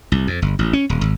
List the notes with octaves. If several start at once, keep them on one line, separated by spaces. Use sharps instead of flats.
C2
F2
G1
A1
C#4
D#1
G#1